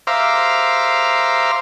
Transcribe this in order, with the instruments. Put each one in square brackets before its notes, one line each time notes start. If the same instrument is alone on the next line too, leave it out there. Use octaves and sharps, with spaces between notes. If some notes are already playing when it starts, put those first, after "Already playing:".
[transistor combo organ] C5 E5 F5 A#5 D6